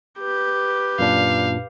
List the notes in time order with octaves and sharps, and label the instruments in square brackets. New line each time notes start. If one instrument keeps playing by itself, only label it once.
[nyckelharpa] G4 B4
[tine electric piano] F#2 A#2 D4 [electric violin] F5